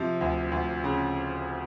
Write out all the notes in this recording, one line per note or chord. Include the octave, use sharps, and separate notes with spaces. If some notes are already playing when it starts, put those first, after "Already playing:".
Already playing: C3 F3
D2
D2
C#3